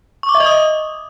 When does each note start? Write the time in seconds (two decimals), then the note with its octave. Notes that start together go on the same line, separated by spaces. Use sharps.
0.23 C#6
0.29 D6
0.35 E5
0.40 D#5
0.46 D#6